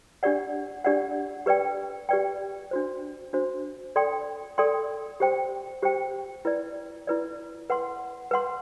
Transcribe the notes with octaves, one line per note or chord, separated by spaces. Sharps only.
D4 G4 D5 F#5
D4 G4 D5 F#5
G4 B4 D5 G5
G4 B4 D5 G5
D4 F#4 C5
D4 F#4 C5
A4 D5 G5 C6
A4 D5 G5 C6
G4 C5 G5
G4 C5 G5
E4 B4 D5
E4 B4 D5
B4 F#5 C6
B4 F#5 C6